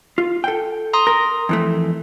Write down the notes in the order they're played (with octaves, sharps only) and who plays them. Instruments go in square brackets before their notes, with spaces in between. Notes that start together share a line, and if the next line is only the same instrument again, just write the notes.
[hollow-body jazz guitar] F4
A4 G5
[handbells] A#5 C6 D#6
[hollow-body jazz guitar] A#4
F2 E3 A3